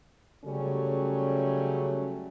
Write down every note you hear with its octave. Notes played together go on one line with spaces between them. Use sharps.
C#3 F#3 G3 A3 C#4